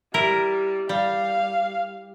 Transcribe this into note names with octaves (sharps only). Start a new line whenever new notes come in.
G3 E4 A#4
G3 F5